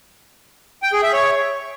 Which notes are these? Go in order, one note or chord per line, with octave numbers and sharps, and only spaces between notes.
G5
G#4
E5
C#5